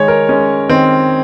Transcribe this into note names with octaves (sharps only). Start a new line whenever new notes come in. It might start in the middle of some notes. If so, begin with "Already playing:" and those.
Already playing: D#3 G#3 C#5
A#4
G#3 C#4
D#3 C4